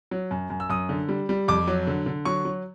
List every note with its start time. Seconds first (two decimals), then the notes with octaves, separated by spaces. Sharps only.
0.11 F#3
0.31 F#2
0.50 F#2
0.60 E6
0.70 F#2 D#6
0.89 D3
1.09 G3
1.29 G3
1.48 F2 D6
1.67 F#3
1.87 D3
2.06 D3
2.25 F#3 C#6
2.45 F#3